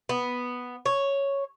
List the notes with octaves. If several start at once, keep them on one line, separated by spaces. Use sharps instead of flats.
B3
C#5